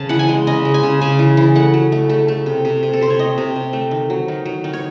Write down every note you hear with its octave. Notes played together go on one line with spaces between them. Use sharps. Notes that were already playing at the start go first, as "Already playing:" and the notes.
Already playing: C#3 A5
E3 F#5
G#5
G#3
C#3 D#5
G#3
G#5
C#3
C#3 G#5
E3
E3
A3 F#5
F#3
A3
A3
A3
C3
C3
C3
A4
C3 C5
C#5
A3 D#5
C3
C3
A3
D#3
F#3
D#3
F#3
D#3
C#5